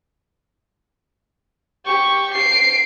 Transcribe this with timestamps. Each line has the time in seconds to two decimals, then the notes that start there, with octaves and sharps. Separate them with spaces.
1.85 G4 C#6
2.34 C7 D7